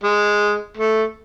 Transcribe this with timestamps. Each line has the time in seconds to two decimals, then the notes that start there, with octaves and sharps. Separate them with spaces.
0.03 G#3
0.77 A3